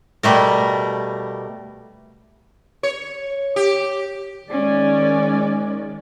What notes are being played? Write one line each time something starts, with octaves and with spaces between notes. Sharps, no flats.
B2 G3 A3 A#4
C#5
G4
D#3 G#3 C#4 D5